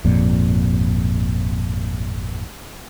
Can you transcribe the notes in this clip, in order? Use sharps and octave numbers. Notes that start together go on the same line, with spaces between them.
G#1 F2 A#2